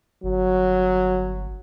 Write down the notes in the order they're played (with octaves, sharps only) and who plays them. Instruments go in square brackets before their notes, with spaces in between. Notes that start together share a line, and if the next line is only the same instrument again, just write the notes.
[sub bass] G1 [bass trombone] F#3